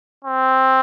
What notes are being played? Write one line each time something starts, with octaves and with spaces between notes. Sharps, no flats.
C4